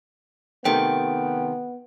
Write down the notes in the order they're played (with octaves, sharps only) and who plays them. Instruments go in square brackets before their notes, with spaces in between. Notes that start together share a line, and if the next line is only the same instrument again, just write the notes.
[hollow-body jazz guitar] C3 D#3 A3 [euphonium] B3 [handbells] G5